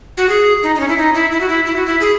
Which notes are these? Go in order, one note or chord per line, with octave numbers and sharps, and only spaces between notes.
F#4
G#4
D#4
D#4
C#4
E4
D#4
E4
E4
F#4
E4
E4
F#4
E4
G#4